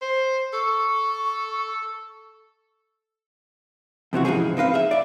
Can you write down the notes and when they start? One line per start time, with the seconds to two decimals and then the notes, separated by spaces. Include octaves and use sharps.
0.02 C5
0.54 A4 C#6
4.13 F2 C3 E3 F#4
4.25 G#2 C#3 E3 F3 G#4
4.57 C4 D#4 B4 F5
4.74 G#4 E5
4.91 D5 E5